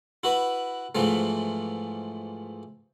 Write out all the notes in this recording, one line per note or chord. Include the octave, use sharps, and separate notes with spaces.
E4 F#4 B4
G#2 E3 F3 A3